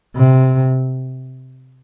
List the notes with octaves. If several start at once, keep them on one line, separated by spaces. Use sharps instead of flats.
C3